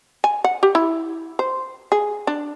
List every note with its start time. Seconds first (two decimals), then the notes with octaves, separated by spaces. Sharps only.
0.24 G#5
0.44 F#5
0.63 G4
0.75 E4
1.39 C5
1.92 G#4
2.27 D4